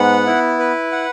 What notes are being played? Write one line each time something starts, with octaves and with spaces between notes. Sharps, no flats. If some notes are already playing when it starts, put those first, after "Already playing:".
Already playing: G#2 B3 F#5
E4
B4
F#5